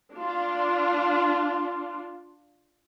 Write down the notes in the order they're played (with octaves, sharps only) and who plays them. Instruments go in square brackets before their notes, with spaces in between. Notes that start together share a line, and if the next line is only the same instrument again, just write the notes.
[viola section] D4 F4